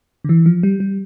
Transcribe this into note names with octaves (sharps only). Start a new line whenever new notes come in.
D3
E3
F3
G3
G3